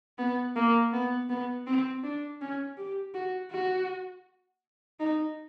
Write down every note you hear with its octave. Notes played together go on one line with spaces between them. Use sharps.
B3
A#3
B3
B3
C4
D4
C#4
G4
F#4
F#4
D#4